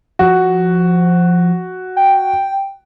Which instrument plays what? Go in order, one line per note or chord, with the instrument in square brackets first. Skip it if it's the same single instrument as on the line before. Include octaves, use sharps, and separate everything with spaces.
[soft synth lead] F3 [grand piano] F#4
[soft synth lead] G5